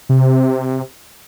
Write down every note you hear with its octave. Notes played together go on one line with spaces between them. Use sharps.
C3